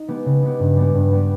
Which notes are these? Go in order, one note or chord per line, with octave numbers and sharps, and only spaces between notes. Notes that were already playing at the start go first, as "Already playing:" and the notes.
Already playing: D#4
G#3 B3 G4
C#3
G#3 B3 G4
G2
G3 B3 G4
G2
G3 B3 G4